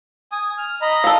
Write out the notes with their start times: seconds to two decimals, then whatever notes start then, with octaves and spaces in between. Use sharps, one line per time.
0.32 G#5 D#6
0.58 F6
0.82 D#5 A#5 B5
1.04 A4 F5